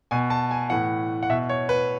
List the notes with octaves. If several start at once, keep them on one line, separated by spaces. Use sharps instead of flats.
B2 G#5
A5
G#5
A2 E3 F#5
F#5
B2 E5
C#5
B4